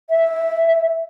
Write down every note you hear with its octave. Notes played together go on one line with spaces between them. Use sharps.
E5